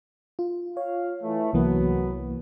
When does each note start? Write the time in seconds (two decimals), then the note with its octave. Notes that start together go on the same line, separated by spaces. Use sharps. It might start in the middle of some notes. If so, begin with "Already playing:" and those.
0.39 F4
0.77 F4 C#5 F5
1.22 E3 A3
1.54 C2 E3 F#3 A#3 B3